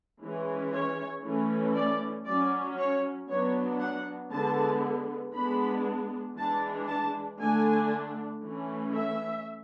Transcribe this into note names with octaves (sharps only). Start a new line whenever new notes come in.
E3 G#3 C#4
C#5
E3 A3 C#4
D5
F#3 C#4 D5
C#5
F#3 B3 D4 C#5
F#5
D3 G#3 B3 A5
G#3 B3 D4 B5
E3 G#3 D4 A5
A5
D3 A3 D4 G#5
E3 A3 C#4
E5